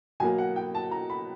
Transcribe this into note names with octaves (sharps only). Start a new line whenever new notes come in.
B2 F#3 A#3 G#5
F#5
G5
A5
A#5
B5